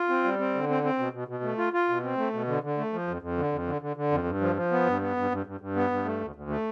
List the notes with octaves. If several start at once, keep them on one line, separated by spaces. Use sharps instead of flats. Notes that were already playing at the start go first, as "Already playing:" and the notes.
Already playing: F4
C4
G3
C4
D3
C4
C4
B2
B2
B2
A3
F4
F4
B2
C4
A3
B2
D3
D3
A3
F3
F2
F2
D3
F2
D3
D3
D3
F2
G2
F3
F3
B3
G2
B3
G2
G2
G2
G2
B3
G2
A3
D2
D2
A3